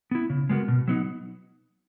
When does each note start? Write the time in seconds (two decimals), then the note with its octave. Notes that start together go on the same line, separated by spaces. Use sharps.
0.11 B3 E4
0.30 C#3
0.49 G#3 B3 F#4 A#4
0.68 B2
0.88 F#3 B3 D#4